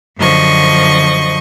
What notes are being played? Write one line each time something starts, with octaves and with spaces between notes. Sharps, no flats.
F#2 D3 F3 D#5 C#6